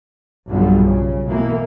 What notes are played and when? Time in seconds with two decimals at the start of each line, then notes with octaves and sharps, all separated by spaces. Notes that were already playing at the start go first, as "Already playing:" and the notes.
0.50 B1 G2 A#2 D3 F3 G3
0.85 C#3
1.26 B2 E3 A#3